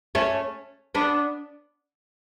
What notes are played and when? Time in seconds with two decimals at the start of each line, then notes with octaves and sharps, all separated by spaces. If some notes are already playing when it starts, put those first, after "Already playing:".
0.15 A3 C#4
0.95 B3 D4